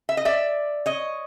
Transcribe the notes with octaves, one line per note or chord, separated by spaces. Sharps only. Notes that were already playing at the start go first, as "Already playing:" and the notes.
E5
D#5
D5 E5
C#5 D#5